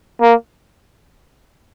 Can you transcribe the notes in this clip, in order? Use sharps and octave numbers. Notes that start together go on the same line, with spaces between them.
A#3